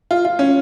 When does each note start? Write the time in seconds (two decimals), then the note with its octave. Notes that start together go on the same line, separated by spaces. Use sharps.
0.11 F4
0.25 F4
0.39 C#4